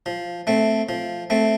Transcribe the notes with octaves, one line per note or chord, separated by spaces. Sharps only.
F3
A3 C4
F3
A3 C4